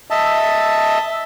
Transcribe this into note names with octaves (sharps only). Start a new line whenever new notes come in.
D#5 E5 A5